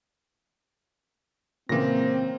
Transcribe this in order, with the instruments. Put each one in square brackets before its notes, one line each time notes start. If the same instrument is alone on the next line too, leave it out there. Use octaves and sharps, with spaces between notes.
[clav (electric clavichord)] A#2 C#3 E3 [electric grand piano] A#3 A#6 [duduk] C4